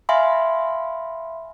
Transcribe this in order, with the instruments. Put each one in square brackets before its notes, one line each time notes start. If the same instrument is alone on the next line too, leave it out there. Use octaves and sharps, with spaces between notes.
[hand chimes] E5 F5 G#5 B5 C6